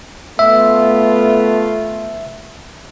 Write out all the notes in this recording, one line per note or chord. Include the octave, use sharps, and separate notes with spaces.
A3 B3 F4 E5